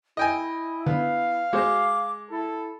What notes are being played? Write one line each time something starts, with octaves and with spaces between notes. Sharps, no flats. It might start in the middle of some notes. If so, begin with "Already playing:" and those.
E4 D#5 G5 G#5
D3 B3 F5
G#3 F#4 C5 D6
E4 A4